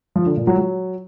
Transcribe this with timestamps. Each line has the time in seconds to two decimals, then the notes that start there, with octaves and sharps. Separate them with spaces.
0.16 F3
0.26 D3
0.37 A#2
0.47 F#3
0.58 F#3